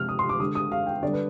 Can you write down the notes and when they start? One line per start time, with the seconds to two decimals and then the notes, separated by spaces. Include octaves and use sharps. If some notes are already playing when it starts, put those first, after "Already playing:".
Already playing: C3 F3 G#3 F6
0.09 D#6
0.19 C6
0.29 D6
0.40 D3 G#3 D#6
0.55 D#6
0.72 F5
0.86 G5
1.02 D3 G3 D5
1.13 B4